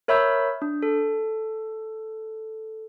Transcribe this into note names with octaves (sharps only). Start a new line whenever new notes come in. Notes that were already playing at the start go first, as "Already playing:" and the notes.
A#4 C#5 E5 B5 E6 G6
D4
A4